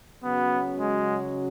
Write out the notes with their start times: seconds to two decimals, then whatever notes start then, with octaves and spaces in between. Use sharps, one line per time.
0.24 C#3 F#3 B3 C#4 F#4
0.79 G#3